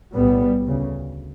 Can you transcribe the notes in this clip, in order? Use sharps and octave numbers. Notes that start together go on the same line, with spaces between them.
B1 A2 G3 B3
D2 C#3